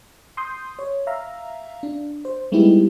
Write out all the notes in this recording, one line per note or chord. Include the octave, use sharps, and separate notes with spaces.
C6 D#6 G6
C#5
E5 F5 A#5
D4
C5
G3 G#3 B3 D#4 E4 G4